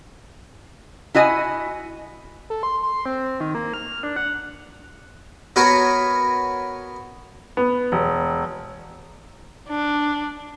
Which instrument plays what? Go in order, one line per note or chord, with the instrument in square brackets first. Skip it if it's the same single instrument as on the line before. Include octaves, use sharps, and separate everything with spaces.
[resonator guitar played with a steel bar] E4 F#4 D#5 G#5
[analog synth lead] A4
C6
C6
C4
D#3
A#3
F6
D4
F#5
[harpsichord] B3 F#4 A#4 B4 C#5
[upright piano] B3
E1
[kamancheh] D4